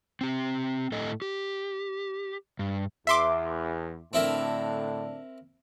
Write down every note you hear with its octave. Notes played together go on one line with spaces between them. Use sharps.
C4 G4
A2 A4 D#5
G4
G2
E2 E5 C6 D6
A2 D3 C4 D4 E4 A#4